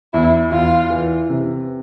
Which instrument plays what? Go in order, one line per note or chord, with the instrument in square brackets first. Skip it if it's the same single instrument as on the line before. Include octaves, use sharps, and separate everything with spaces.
[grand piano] E2 [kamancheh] E4
[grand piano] E2 [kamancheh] F4
[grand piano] E3
C3